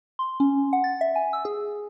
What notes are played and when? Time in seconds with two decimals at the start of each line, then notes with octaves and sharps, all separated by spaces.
0.19 C6
0.40 C#4
0.73 F#5
0.84 A6
1.01 E5
1.16 G#5
1.33 E6
1.45 G#4